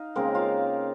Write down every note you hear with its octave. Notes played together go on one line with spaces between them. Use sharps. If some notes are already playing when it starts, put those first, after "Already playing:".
Already playing: D#4 F5
C#3 G#3 A#3 C4 A#4
F4 F5